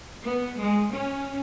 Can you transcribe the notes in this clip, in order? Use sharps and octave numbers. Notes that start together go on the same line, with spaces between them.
B3
G#3
C#4